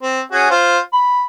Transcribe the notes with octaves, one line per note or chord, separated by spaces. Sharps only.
C4
C#4 F#4 G#4
F4 C5
B5